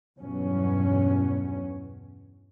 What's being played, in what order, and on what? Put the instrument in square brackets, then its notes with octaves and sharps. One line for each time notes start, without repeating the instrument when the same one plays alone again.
[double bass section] E2 G2 B2 F#3 C#4